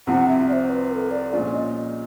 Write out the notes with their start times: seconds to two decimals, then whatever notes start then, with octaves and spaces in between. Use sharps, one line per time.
0.07 C2 C3 F3 F#5
0.28 E5
0.48 D5
0.53 C5
0.70 B4
0.91 A#4
0.95 A4
1.11 D5
1.32 A#2 F3 G#3 C#4 F4 D5
1.53 D#5